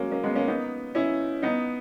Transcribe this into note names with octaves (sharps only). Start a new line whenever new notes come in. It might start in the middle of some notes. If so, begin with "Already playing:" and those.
Already playing: F#3 G#3 A#3 C#4
A#3 C#4
G#3 B3
A#3 C#4
B3 D#4
C#4 E4
B3 D#4